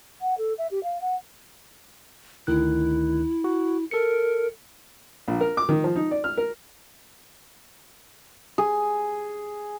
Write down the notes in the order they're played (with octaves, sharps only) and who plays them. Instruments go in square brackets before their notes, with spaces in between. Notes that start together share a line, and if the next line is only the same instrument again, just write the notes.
[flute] F#5
A4
E5
G4
F5
F#5
[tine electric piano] D2 D#3 F#6 [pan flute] E4
[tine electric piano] F#4
[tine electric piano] A4 C#7 [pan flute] A#4
[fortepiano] A#1
A#4
D6
D#3
F3
D#4
D5
F6
A#4
[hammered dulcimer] G#4